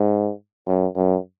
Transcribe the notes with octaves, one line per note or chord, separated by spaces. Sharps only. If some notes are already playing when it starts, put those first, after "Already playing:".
Already playing: G#2
F#2
F#2